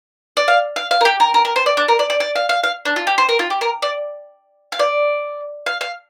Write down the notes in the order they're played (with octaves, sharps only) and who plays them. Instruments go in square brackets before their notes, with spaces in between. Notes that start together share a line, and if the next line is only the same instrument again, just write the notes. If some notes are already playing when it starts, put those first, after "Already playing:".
[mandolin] D5
F5
F5
F5
A#4
G4
A#4
A#4
A#4
C5
D5
D4
A#4
D5
D5
D5
F5
F5
F5
D4
F4
G4
C5
A#4
F4
G4
A#4
D5
F5
D5
F5
F5